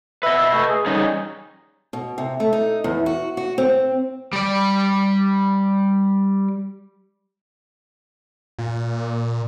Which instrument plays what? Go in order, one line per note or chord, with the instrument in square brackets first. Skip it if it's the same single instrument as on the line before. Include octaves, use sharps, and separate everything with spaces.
[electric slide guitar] B4 D#5 [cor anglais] E5
[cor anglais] E5
A3
G#4
[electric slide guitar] G3 C#4 G#4 [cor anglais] D#4
[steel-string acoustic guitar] B2
C3
A3
D#4
E2
F#4
F#4
C4
[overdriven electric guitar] G3 D5
[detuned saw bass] A#2